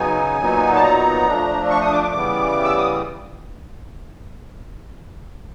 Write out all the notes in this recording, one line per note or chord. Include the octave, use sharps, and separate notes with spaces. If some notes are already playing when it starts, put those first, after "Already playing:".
Already playing: C#3 F#3 B3 D#4 G#5
A#2 F#3 B3 D#4
A5
A#5
F3 A3 D4
C#6
D#6
D6
D6
C#3 E3 G3 B3
E6
D#6